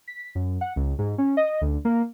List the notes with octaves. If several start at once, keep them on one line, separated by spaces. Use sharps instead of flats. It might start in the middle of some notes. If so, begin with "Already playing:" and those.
B6
F#2
F#5
C#2
G#2
C#4
D#5
D2
A#3